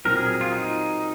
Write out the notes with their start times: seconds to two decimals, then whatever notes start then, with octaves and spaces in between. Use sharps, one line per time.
0.05 A#2 F#3 C4 A#4
0.16 G#4
0.41 F4
0.52 D#4